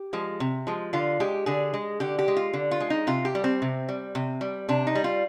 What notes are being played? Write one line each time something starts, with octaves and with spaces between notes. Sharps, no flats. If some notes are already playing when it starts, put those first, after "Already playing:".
Already playing: G4
F3 G#3
C3
F3 G#3
D3 F4
G#3 G4
D3 G#4
G#3
D3 G4
G4
G#3
F4
D3
F4
G#3
D#4
C3 F4
G4
G3
C4
C3
G3
C3
G3
C3 D4
D#4
G3
F4